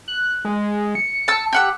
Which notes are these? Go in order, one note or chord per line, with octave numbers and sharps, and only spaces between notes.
F#6
G#3
C#7
A5 E6
G4 F#5 E6